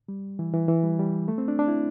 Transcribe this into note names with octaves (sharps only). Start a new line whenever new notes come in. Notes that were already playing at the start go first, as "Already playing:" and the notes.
G3
E3
E3
E3
G3
G3
A3
C4
D4
D4
E4